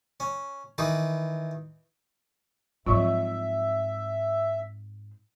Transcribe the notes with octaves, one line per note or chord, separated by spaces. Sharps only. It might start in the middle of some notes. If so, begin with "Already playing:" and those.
C#4
D#3 E3 B4
G#2 F3 F#3 C4 F4 E5